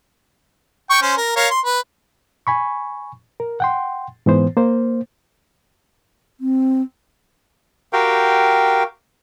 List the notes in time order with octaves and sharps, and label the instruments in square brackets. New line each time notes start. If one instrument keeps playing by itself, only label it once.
[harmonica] G5 C#6
C#4 C5
A#4
A#4 C#5 F5
C6
B4
[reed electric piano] G#5 B5 C#6
A#4
F#5 G5 C6
G#2 E3 B3 C5
A#3 C5
[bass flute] C4
[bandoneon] F#4 G4 A#4 F5 G5